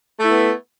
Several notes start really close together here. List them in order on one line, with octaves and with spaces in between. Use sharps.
A3 E4 B3